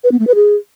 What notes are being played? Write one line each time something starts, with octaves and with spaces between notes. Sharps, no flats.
B4
B3
A3
B4
G#4